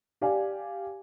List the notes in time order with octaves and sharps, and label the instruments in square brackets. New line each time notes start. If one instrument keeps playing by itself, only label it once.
[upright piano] G4 D5 F5 G#5